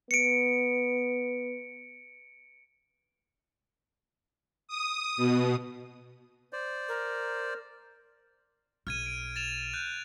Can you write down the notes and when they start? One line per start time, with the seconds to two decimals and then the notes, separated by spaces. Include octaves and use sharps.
0.11 B3 C#7 D7
4.68 D#6
5.17 B2
6.53 C5 D5
6.88 A#4
8.87 B1 F6 G#6 D#7
9.06 D7
9.36 A6 E7 F7
9.74 F#6 G6